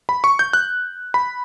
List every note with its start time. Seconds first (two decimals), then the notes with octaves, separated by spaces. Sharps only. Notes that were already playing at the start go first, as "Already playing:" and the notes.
0.09 B5
0.24 C#6
0.39 G6
0.53 F#6
1.14 B5